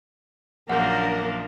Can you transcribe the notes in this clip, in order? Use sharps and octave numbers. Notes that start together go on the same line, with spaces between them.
A#1 F#2 A#3 D4 A#4 F#5 G6